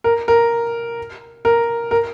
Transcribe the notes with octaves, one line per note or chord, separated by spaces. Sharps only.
A#4
A#4
A#4
A#4